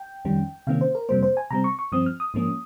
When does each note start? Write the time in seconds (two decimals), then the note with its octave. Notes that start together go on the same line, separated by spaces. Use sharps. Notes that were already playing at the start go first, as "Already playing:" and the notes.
Already playing: G5
0.25 F2 D#3 G3 C#4
0.67 C3 D#3 A#3 C#4 F5
0.81 C5
0.95 A#4
1.09 F2 C3 G3 A#3 C5
1.23 C5
1.37 G#5
1.50 C3 G3 C4 A#5
1.64 C#6
1.79 C#6
1.92 G2 F3 C4 D#6
2.06 F6
2.20 D#6
2.34 G#2 F3 A#3 C#4